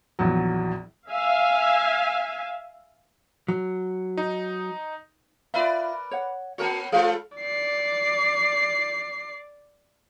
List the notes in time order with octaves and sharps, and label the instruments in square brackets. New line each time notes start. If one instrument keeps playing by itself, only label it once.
[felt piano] A#1 E2 F#3
[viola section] E5 F5 G#5
[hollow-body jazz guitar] F#3
[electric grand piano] D#4
[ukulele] F4 E5 [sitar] A#4 B4 D5
[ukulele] C#5 F#5
[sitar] A#3 B3 C#5 [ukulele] F#4 A#4 A5
[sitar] G#3 F4 A4 [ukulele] G#4 C5 F5
[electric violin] D5 C7